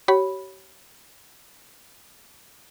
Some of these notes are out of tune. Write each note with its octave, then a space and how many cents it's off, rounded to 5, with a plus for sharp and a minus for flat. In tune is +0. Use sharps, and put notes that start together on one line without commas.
G4 -45 C#5 +0 B5 -5